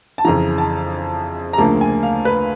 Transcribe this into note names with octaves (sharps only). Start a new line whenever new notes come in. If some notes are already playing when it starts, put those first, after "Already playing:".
A5
F2 C#3 E3 A#5
A5
A#5
D2 C#3 F3 A#3 A5
G#5
F5
B4